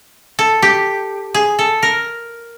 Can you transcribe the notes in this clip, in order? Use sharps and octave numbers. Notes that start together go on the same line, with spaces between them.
A4
G4
G#4
A4
A#4